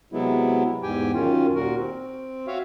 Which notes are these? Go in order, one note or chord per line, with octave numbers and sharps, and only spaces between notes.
C3 F#3 G#3 B3 E4
E2 G#2 G4 G5 G#5
F#2 D#3 C#4 F4
D#2 A#2 F#4 A#4
C4
F#4 C#5 E5 F5